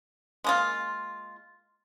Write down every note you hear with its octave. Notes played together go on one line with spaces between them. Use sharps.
G#3 A#3 F4